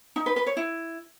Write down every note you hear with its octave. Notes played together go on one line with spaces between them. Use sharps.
D#4
B4
B4
C#5
E4